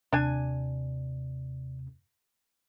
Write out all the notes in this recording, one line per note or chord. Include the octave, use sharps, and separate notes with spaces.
D#2 C3 D4 G#5